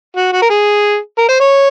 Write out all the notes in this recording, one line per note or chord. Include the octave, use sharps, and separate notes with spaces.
F#4
F#4
A#4
G#4
A#4
C5
C#5